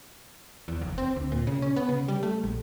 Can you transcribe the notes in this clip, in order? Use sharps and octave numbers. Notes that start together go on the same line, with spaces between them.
E2
F1
C4
D2
A#2
C#3
C#4
B3
C#3
G3
A3
A#1